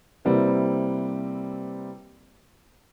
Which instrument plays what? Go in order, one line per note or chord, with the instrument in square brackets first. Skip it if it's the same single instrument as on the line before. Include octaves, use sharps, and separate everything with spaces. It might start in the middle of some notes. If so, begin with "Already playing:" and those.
[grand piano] C3 G3 A#3 C4 E4 B4